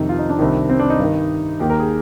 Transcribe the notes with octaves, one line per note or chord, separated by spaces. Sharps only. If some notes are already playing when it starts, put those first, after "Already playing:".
Already playing: F2 C3 D#3 D#4
F4
D#4
D4
C2 C3 D#3
C4
D4
D#4
G2 D#3
D#2 D#3 G4
A#4
G#4